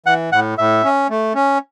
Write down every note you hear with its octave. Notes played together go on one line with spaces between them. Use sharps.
E3 F#5
A2 F#5
A2 E5
C#4
A3
C#4